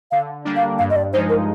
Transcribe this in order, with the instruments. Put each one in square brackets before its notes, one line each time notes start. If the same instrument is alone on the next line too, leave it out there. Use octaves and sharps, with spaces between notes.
[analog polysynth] D3 [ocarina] F5
[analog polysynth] G3 A#3 D4
[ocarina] F5
[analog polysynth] G2 [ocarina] F5
[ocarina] D#5
D5
[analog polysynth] F3 G#3 D#4 [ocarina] C5
[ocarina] A#4